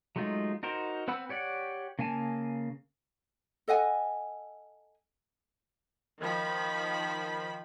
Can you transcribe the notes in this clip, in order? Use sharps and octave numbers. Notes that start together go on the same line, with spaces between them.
F#3 G#3 A3 D#4 F4
D#4 F#4 A#4 C5
C4 B4 F#5 B5 E6
G4 C#5 D5 F#5
C#3 A#3 F5 G#5 A5
A4 D#5 F#5 G#5
D#3 F3 B5